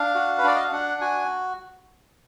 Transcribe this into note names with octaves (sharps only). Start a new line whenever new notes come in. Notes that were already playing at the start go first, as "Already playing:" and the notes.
Already playing: D4 F5
F#4
B4
D4 D5
D#5
F5
D4 F#5
F#4 G#5